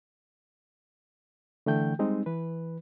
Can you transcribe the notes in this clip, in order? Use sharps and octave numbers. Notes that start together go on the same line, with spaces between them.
D3 E3 A3 G5 G6
G3 G#3 C4 D#4
E3 B4